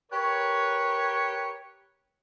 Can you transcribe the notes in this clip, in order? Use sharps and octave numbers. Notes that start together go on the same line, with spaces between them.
G4 A#4 B4 C#5